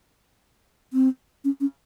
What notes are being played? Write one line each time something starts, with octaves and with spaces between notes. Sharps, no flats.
C4
C#4
C#4